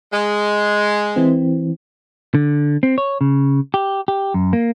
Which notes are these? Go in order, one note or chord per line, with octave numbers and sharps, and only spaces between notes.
G#3
E3 C4
D3
C4
C#5
C#3
G4
G4
F#2
A#3